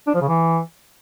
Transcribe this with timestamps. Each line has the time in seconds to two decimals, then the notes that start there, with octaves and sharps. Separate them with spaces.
0.07 D4
0.14 F3
0.21 C#3
0.28 E3